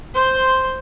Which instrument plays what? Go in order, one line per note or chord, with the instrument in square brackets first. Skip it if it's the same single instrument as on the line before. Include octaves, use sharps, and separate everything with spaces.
[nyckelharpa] C5 C6